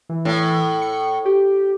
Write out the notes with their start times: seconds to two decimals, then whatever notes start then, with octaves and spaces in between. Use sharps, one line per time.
0.09 E3
0.25 A2
0.82 C#7
1.25 G4